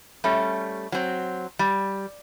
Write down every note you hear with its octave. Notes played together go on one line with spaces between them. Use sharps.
G3 A3 C#4
F#3 C4
G3